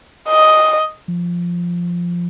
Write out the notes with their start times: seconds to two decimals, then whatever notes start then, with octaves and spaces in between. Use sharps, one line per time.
0.29 D#5
1.08 F3